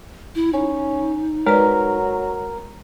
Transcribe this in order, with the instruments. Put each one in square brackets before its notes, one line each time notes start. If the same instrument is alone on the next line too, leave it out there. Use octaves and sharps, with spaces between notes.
[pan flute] E4
[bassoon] C#4 [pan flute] D#4
[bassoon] F#3 [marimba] G#3 B4 D5 [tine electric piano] A#4